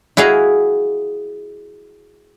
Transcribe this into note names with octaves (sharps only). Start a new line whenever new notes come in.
E4 F#4 G#4 D#5 F5